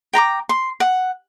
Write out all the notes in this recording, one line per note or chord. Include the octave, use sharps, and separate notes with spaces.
G5 A#5 B5 D6
C6
F#5